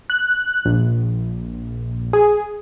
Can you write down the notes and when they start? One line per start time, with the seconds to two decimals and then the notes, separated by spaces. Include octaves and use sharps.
0.10 F#6
0.65 A#1
2.13 G#4